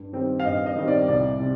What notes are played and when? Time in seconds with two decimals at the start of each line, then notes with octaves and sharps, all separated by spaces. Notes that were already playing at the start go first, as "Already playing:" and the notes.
Already playing: G2
0.13 D#3 G3 C4
0.40 F5
0.44 G2 D#5
0.66 D#5
0.76 D#3 G3 C4
0.88 D5
1.08 C2 D5
1.40 C3